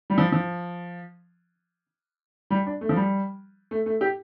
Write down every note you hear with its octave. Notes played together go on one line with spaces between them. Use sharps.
G3
F3
F3
G3
D4
A3
F3
G3
A3
A3
G4